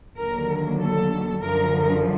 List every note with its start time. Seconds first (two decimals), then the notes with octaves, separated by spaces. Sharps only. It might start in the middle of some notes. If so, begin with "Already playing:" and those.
0.18 D#2 D3 F#3 A#4
0.80 A4
1.43 F#2 D3 F3 A#4